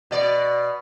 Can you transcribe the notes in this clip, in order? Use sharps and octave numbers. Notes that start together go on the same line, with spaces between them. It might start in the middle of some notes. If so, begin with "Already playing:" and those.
B2 D5